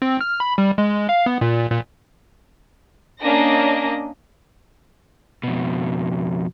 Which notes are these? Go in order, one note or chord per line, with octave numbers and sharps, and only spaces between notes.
C4
F6
B5
G3
G#3
F5
B3
A#2
A#2
A#3 C#4 D4 D#5 A#6
F2 B2